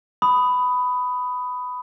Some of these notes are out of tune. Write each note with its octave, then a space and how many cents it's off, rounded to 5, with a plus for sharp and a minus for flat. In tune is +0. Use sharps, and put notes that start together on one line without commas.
B5 +10 D#6 +0